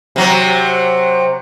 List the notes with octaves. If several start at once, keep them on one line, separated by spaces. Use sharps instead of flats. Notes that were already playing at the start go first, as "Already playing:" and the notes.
C3 F#3